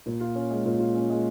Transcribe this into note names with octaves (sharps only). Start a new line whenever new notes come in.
A#2
F4
C#4
G#3
A#2
F4
C#4
G#3